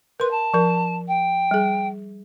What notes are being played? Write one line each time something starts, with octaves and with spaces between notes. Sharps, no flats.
A#4 B4 C6
A5
F3 A#4
G5
G3 G#4